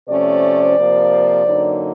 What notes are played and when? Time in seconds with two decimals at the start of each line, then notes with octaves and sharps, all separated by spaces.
0.08 C3 F3 A3 C#4 C5 D5
0.77 C3 F3 A#3
1.45 F#2 D3 F#3 A#3 D#4